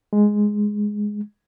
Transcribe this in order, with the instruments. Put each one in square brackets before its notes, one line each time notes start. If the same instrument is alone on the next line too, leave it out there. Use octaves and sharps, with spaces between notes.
[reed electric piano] G#3